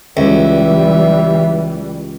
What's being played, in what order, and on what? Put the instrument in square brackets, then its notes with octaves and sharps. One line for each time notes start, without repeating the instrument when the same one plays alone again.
[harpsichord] C#2 [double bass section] E3 G3 [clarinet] E5